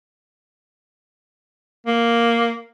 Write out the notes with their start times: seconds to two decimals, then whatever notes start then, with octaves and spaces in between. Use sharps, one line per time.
1.87 A#3